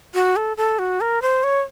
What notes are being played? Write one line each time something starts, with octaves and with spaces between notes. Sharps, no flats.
F#4
A4
A4
F#4
A#4
C5
C#5